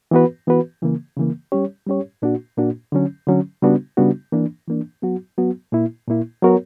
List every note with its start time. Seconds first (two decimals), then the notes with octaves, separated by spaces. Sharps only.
0.11 E3 B3 F#4 B4
0.47 E3 B3 F#4 B4
0.82 C#3 E3 A#3
1.17 C#3 E3 A#3
1.52 G3 C#4 G4 C#5
1.86 G3 C#4 G4 C#5
2.22 A#2 A#3 D4 F#4
2.58 A#2 A#3 D4 F#4
2.92 D3 F#3 C#4
3.27 D3 F#3 C#4
3.62 C#3 G3 B3 D4 F#4
3.97 C#3 G3 B3 D4 F#4
4.32 E3 A#3 D4
4.68 E3 A#3 D4
5.02 F#3 B3 F#4
5.38 F#3 B3 F#4
5.72 A#2 A#3 E4
6.08 A#2 A#3 E4
6.42 F#3 B3 F#4 A#4 C#5